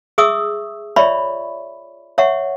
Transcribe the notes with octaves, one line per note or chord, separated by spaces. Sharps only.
G#4 E5 C#6 D#6 E6
F4 C#5 D5 E5 B5 C#6
C#5 E5 F#5 C#6